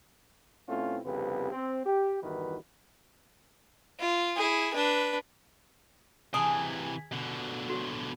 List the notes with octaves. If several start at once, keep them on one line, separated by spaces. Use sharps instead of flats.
B2 A3 C4 C#4 E4 F4
C2 F2 C#3 B3 G4 B4
C4
G4
E2 G2 D#3 E3 F#4 B4
F4
E4 G#4
D4 B4
C3 E3 G#4 G#5 A5
B2 D3
F#4 C#5